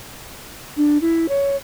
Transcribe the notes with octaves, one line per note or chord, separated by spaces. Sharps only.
D4
E4
C#5